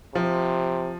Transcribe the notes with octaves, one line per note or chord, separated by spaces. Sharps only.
C3 F3